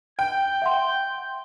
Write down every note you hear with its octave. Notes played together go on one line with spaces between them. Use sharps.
G5 G6
E5 F#5 C6